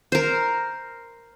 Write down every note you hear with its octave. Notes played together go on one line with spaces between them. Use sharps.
A#4 C5